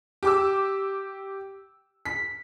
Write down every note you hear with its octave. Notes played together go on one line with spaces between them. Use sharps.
G4 D6 E6
B6